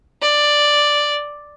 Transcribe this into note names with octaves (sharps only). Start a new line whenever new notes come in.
D5